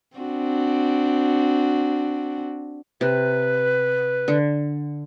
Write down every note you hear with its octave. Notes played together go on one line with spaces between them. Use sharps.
C4 D4 F#4
C3 B4
D3